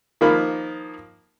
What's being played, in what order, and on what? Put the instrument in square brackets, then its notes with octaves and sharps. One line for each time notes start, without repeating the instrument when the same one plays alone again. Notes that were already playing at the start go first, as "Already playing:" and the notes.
[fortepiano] D#3 F3 A#3 B5